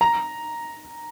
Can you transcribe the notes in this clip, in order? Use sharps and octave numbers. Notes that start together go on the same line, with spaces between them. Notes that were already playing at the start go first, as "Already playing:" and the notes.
A#5